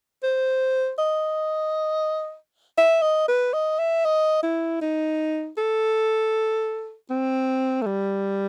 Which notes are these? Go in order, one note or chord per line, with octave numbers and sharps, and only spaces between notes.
C5
D#5
E5
D#5
B4
D#5
E5
D#5
E4
D#4
A4
C4
A3
G3